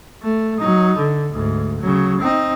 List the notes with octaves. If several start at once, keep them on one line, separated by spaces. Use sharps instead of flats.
A3
F#3 D#4
D3
D2 G#2
C#3 F#3
C4 D#4